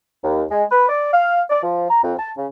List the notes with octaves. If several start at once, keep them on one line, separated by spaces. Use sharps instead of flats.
D#2
G#3
B4
D5
F5
D5
F3
A#5
F2
A5
C#3